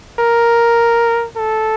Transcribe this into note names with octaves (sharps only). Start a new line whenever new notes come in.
A#4
A4